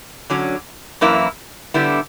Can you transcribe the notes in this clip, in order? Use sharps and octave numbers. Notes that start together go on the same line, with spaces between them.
D3 F#3 C#4
F#2 E3 A#3 E4
D3 G3 B3 E4